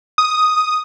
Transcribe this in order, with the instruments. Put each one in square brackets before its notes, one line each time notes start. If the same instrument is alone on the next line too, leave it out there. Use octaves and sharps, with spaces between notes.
[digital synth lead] D#6